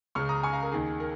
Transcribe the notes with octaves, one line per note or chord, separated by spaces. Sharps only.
C#2 C#3 C#6 F6
A#5 D#6
G#5 C#6
F5 A#5
A#4
D#2 D#3 G#4
A#4